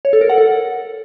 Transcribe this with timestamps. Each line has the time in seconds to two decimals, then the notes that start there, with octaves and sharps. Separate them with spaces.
0.05 C#5
0.13 A4
0.21 A#4
0.29 F#5
0.38 A4